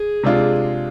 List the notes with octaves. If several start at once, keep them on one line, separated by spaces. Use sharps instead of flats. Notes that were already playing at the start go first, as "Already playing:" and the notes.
Already playing: G#4
C3 G#3 D4 F4